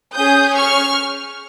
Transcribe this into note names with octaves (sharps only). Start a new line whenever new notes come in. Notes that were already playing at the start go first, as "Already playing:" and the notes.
C#4 G#4 D#6 G6
C#6 F6